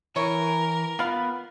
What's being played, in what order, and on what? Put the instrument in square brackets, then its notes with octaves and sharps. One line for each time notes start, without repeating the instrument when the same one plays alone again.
[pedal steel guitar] E3 [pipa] E4 C#5 [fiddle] A#4
[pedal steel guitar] B3 B5 [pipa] F4 F5